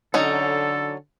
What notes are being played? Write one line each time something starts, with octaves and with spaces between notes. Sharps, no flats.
D3 F#3 C#4 D#4 A4